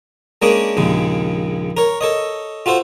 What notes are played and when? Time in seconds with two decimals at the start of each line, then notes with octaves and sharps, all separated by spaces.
0.42 G#3 A#3 C#4 D4 G#4 C#5
0.77 A#1 D#2 C#3 G#3
1.77 A#4 C#5
2.01 A4 C#5 D#5
2.66 F4 F#4 A4 C5